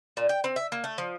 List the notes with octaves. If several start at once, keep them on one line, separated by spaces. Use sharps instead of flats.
A#2
G5
C4
E5
A#3
A3
F3